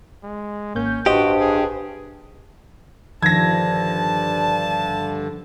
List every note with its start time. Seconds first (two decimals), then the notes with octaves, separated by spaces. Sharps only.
0.23 G#3
0.75 G#1 A#3 C#4 G6
1.06 A1 G2 F#4 G4 C5 D#5
1.40 G#4
3.23 G2 D3 D#3 F3 A5 G#6 A#6